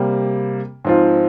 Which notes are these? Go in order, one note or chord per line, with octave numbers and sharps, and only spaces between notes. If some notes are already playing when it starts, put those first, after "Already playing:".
Already playing: C3 G3 A#3
G#2 F3 C4 F4